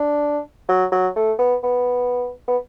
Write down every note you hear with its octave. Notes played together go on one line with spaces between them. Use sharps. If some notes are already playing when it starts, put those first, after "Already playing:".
Already playing: D4
F#3
F#3
A3
B3
B3
B3